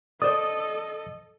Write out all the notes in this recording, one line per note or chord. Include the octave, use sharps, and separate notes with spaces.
A4 C5 D5 D#5 D#6